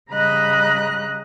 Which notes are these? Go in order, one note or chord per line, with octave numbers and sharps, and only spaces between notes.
C#3 G3 D#5 A#5 B5 F#6